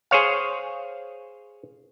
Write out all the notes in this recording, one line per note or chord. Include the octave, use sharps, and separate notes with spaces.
G#4 C5 C#5 F5